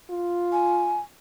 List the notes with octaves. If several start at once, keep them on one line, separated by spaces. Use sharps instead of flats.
F4
G#5